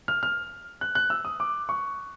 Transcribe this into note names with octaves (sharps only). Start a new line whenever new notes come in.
F6
F6
F#6
F#6
E6
D#6
D6
C#6